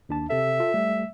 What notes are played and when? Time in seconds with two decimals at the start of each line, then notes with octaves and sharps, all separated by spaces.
0.09 D#2 D4 A5
0.30 C3 A4 E5
0.60 F4 A4
0.74 G3 A3